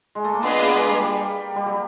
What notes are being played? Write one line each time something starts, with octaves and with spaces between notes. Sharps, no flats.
G#3
A3
A#3
B3 D4 F4 G#4 B4 D#5
A#3
G#3
G3
G3
G3
F#3